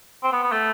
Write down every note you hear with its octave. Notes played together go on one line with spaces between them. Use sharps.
C4
B3
B3
A3